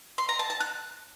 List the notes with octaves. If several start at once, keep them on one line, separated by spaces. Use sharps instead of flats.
C6
A#5
A5
A5
F#6